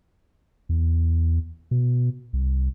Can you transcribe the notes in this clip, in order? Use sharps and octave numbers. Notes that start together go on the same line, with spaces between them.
E2
B2
C2